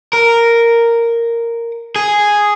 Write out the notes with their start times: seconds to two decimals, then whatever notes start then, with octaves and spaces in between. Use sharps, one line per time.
0.13 A#4
1.96 G#4